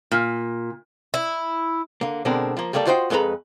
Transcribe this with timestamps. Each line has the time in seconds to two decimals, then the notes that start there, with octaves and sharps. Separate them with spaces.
0.11 A#2
1.14 E4
2.01 D3 A#3
2.25 B2 D3 G#3 C4 D4 A#4
2.57 F3 A#3
2.73 G3 A3 A#3 A4 D5
2.86 F4 F#4 C5 D#5 F#5 G5
3.10 F2 G#3 A4 B4 A#5 B5